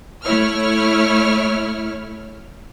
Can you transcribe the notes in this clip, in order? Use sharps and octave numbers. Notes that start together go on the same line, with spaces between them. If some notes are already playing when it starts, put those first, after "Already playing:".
A3 E4 C#5 F6